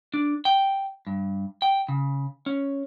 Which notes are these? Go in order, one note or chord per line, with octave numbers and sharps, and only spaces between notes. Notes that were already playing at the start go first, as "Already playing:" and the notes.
D4
G5
G2
G5
C#3
C#4